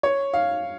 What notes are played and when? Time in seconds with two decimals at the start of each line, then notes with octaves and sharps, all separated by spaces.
0.03 C#5
0.34 F5